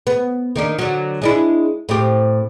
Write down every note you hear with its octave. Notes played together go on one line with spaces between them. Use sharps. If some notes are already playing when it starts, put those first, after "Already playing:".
B3
D#3 A#3 D4
D3 F#3
G#3 D4 E4
A2 C4 G4